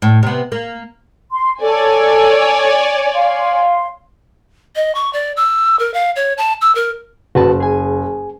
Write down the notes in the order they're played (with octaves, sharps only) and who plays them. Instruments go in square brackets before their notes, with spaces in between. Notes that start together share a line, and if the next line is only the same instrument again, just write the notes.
[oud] A2
C3 B3
A#3
[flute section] C6
[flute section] A4 [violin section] C#5 D5 G#5
[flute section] F5 C6
[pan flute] D#5
C#6
D5
E6
A#4
F5
C#5
A5
E6
A#4
[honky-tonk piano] F#1 [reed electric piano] F#4 B4 A5
[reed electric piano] G#4 G#5